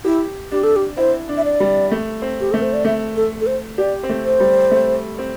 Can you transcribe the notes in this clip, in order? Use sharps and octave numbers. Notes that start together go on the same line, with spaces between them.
E4 G4
D4 G4
A4
G4
E4 C5
D4
E5
D5
G3
A3
C4
G4
A3 A4
C5
D5
A3 E5
A4
A4
C5
G4 D5
C4
A3
C5
G3
A3
C4